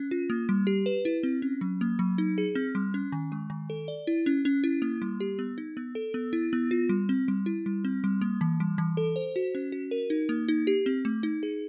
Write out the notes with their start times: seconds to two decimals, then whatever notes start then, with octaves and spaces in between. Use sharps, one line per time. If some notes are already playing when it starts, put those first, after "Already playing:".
Already playing: C#4
0.11 F4
0.30 A#3
0.49 G3
0.67 G4
0.86 B4
1.05 E4
1.23 C4
1.42 C#4
1.61 F#3
1.81 A#3
1.99 F#3
2.18 D#4
2.38 G#4
2.55 C4
2.75 G3
2.94 C#4
3.12 D#3
3.32 G#3
3.50 D#3
3.70 A4
3.88 D5
4.07 E4
4.26 C#4
4.45 C#4
4.64 E4
4.82 A#3
5.02 G3
5.20 G4
5.39 B3
5.58 D#4
5.77 B3
5.95 A4
6.14 B3
6.33 E4
6.53 B3
6.71 F4
6.89 G3
7.09 C4
7.28 G3
7.46 E4
7.66 G3
7.85 C4
8.04 G3
8.21 A#3
8.41 E3
8.60 G3
8.78 E3
8.97 A4
9.16 C5
9.36 F#4
9.55 C#4
9.72 F#4
9.91 A#4
10.10 D#4
10.29 A#3
10.48 D#4
10.67 G4
10.86 C4
11.05 A3
11.23 D#4
11.43 G#4